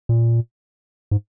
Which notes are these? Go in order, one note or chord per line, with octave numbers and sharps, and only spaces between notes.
A#2
G#2